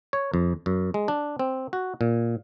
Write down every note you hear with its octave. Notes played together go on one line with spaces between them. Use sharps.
C#5
F2
F#2
G#3
D4
C4
F#4
A#2